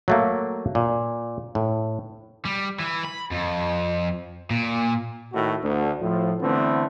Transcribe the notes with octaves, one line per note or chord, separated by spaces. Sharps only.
F#3 A3 A#3
A#2
A2
G3
E3
B5
F2
A#2
A2 D#3 F#4
D2
A2 F3
D3 E3 A3 B3 C4